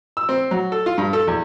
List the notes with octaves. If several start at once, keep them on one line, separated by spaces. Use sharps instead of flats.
E6
C4
F#3
A4
F4
G2
A4
E2